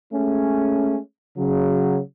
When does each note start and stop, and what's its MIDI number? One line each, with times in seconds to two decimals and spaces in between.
0.13 0.97 56
0.13 0.97 57
0.13 0.97 61
1.38 1.99 49
1.38 1.99 54